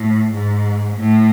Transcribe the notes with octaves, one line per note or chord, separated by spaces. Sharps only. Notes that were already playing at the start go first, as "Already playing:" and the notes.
Already playing: A2
G#2
A2